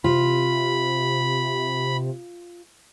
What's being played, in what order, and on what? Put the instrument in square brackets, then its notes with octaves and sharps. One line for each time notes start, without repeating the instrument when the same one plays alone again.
[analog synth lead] C3 [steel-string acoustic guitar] F4 [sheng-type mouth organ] B5